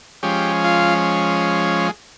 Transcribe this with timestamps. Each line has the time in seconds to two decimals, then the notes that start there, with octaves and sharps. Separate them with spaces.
0.23 F3 G#3 C#4 G4
0.64 F4